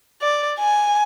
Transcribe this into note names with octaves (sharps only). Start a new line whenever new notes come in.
D5
G#5